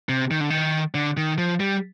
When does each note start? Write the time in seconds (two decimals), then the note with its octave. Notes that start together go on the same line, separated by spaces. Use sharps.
0.09 C3
0.31 D#3
0.40 D3
0.50 D#3
0.94 D3
1.17 D#3
1.38 F3
1.60 G3